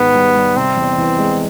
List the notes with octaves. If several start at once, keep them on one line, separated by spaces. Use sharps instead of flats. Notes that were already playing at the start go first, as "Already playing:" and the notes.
Already playing: G#2 D#3 B3
G3
G3
C3 C4
E2
E3
G#3